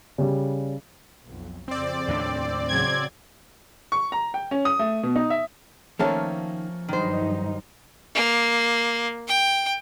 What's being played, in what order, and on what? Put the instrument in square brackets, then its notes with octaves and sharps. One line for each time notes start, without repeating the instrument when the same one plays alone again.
[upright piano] C#3 G3
[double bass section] B1 F2
[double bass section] F2 C#3 [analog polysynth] C4 D5
[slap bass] D#2 A2 D4
[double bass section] A1 C#3 F#3 [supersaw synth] G#6
[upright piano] C#6
A#5
G5
C#4
D#6
A3
B2
D#4
E5
[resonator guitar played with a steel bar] D#3 [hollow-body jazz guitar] F3 F5 A5 [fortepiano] A3 A#3 C#4
[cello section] G2 F#3 D#4 [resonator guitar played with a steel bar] D#3 C5
[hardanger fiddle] A#3
G5